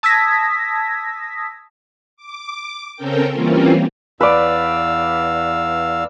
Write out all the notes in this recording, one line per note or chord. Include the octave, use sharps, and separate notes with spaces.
A5 D#6 E6 G#6 A#6 B6
D6
C#3 C4 C#4 A4 A#4 G5
E3 G3 A#3 C4 C#4 F4
E2 B4 D5 F5 E6